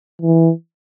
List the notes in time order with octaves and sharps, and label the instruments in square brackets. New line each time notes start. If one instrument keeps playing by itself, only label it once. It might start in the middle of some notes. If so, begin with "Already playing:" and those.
[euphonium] E3